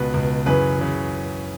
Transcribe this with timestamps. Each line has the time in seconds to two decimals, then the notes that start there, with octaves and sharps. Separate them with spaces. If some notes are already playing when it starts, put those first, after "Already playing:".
Already playing: C#2 B2 B4
0.14 C#2 B2
0.46 F#2 C#3 E3 B4
0.79 C#3 E3